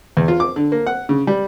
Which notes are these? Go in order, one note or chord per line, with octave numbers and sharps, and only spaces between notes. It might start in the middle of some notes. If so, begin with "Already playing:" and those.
E2
F4
D6
D3
A#3
F#5
C#3
G3